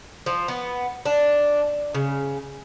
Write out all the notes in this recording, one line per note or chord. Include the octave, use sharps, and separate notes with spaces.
F3
B3
D4
C#3